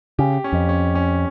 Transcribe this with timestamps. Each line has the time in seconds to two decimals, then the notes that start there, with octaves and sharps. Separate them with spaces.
0.19 C#3 G4
0.44 C#4
0.53 F2
0.69 C#4
0.95 C#4